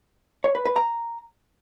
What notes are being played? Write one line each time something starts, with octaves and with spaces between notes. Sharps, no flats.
C#5
B4
B4
A#5